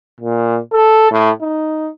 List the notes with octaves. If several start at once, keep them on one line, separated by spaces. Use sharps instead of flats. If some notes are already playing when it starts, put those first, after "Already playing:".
A#2
A4
A2
D#4